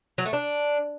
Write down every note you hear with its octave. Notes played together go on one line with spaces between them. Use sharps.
F#3
A3
D4